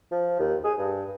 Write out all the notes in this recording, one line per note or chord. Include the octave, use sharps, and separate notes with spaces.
F3
D#2
G#4
G2